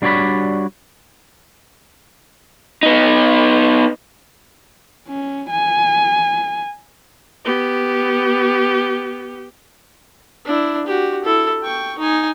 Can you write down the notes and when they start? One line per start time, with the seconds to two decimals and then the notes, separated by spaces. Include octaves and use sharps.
0.02 G3 D4 F#4 C#5 D5 B5
2.83 B3 D#4
5.08 C#4
5.50 G#5
7.45 B3 G4
10.45 D4 E4
10.87 F#4 G4
11.24 E4 A4
11.63 G5 C#6
11.98 D#4 G#5